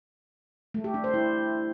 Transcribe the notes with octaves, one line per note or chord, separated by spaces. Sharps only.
A3
G4
D4
C5
E4